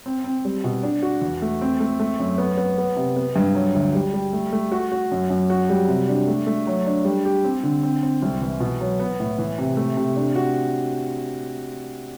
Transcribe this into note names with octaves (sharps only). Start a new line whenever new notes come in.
C4
C4
G3
B2
D4
F#4
E2
A3
C4
A3
A3
F#2
B3
B3
B3
C3
B3
G2
F#3
D2
G3
G3
A3
A3
F#4
F#4
F#2
F#2
F#4
G3
C3
D4
A3
A3
F#3
D4
G3
G4
C4
D3
C4
C4
C2
E3
B2
F#3
B3
A2
E3
C3
A3
C3
D4
F#4